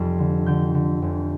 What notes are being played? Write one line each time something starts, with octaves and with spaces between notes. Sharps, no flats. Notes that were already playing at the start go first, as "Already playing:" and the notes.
Already playing: F1 F2 G3
D3
D3 G6
D3
F1